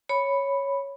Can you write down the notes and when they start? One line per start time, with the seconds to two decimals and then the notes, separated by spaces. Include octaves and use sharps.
0.09 C#5 B5